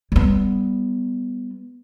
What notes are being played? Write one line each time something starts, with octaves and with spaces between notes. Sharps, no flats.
G3 B3